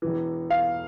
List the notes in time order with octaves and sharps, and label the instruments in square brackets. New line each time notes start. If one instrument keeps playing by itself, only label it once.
[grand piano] E1 E2 E3
[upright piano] F5